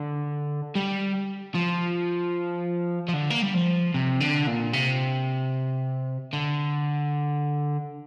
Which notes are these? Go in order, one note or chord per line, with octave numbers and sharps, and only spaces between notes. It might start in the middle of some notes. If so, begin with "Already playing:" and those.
Already playing: D3
G3
F3
F3
D3
A#3
G3
F3
C3
D3
A#2
C3
D3